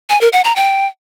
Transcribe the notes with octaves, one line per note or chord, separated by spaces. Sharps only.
G#5
A#4
F#5
A#5
G5